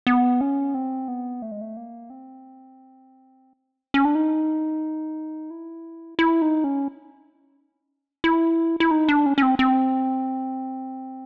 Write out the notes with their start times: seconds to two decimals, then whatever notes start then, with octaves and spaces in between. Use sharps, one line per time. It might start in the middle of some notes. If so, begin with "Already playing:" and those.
0.07 B3
0.41 C#4
0.74 C4
1.08 B3
1.42 A3
1.51 G#3
1.61 A3
1.77 A#3
2.10 C4
3.94 C#4
4.05 D4
4.15 D#4
5.50 E4
6.19 E4
6.42 D#4
6.64 C#4
8.24 E4
8.80 E4
8.91 D#4
9.08 D4
9.26 C#4
9.38 C#4
9.42 C4
9.59 C4